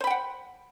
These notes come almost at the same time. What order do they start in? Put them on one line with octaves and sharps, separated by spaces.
C5 B5 G5 F#5